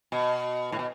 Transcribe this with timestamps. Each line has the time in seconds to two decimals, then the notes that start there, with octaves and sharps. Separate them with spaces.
0.12 B2
0.72 A2
0.79 B2